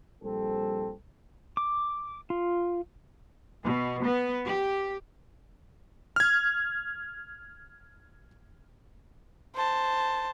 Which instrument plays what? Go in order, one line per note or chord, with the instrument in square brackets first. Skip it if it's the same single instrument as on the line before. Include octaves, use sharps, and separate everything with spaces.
[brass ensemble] A#1 G3 C4 A4
[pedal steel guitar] D6
F4
[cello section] B2
B3
G4
[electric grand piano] F6 G#6
[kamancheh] C5 A5